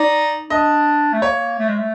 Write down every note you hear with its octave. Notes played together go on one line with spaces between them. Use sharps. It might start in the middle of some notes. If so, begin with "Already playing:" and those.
Already playing: D#4 D5
D4 D#5
A3
A#3 C#5
A3
G#3
A3